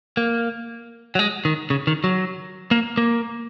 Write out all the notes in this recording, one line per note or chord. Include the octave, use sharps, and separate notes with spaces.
A#3
F#3
G#3
D#3
C#3
D#3
F#3
A#3
A#3